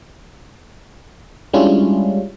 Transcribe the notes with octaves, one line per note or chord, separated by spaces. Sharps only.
G3 G#3 C#4 D4 E4 F4